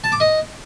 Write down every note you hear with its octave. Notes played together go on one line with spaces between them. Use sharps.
A5
D6
D#5